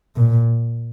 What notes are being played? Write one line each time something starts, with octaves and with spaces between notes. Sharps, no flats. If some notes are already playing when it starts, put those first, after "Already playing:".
A#2